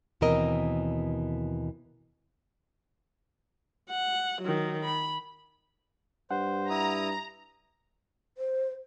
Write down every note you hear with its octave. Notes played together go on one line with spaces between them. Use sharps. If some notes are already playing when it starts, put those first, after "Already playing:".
D#2 B2 E3 C4 A#4 D#5
F#5
D#3 F#3
B5
G2 C5 F#5
E4 A#5 D#6
C5